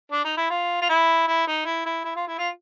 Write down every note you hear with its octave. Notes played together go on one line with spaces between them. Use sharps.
D4
D#4
E4
F4
F4
E4
E4
D#4
E4
E4
E4
F4
E4
F4